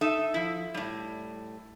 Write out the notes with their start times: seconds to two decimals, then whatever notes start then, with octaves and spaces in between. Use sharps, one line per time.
0.01 D#4 A4 E5
0.34 F3 E4
0.74 A2 G3